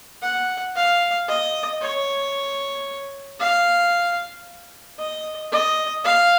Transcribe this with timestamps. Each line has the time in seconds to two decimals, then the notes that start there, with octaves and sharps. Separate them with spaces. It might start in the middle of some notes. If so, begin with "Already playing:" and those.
0.22 F#5
0.76 F5
1.28 D#5
1.82 C#5
3.40 F5
4.99 D#5
5.52 D#5
6.05 F5